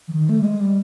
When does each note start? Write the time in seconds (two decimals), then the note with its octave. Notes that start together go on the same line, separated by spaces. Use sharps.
0.08 E3
0.13 D#3
0.29 A3
0.41 G3
0.44 G#3
0.61 G3